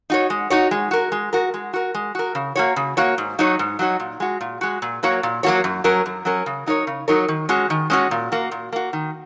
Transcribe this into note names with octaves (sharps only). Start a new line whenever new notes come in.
D#4 F#4 C#5
G#3
D#4 F#4 C#5
G#3
F#4 A#4
G#3
F#4 A#4
G#3
F#4 A#4
G#3
F#4 A#4
C#3
A#3 F#4 C#5
C#3
A#3 F#4 C#5
G#2
F#3 D#4 F#4 C#5
G#2
F#3 D#4 F#4 C#5
A#2
G#3 F#4
A#2
G#3 F#4
A#2
F#3 A#3 F#4 C#5
A#2
F#3 A#3 F#4 C#5
F#2
F#3 C#4 A#4
F#2
F#3 C#4 A#4
C#3
F#3 D#4 A#4 C#5
C#3
F#3 D#4 A#4 C#5
D#3
G#3 C#4 F#4
D#3
G#3 C#4 F#4
A#2
A#3 F#4
A#2
A#3 F#4
D#3